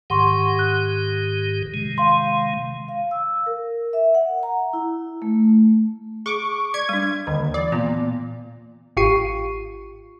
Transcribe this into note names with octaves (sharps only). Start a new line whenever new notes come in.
G#2 D#3 G4 F#5 C6 C#6
F#6
C3 D#3 G#3
F5 C6
F5
E6
A#4
E5
F#5
A#5
E4
A3
G#4 C#6 D6
D5 G#6
G3 D4
D#2 D3
E3 D5
A#2 B3
G#1 F4 G4 C#6 C7 D#7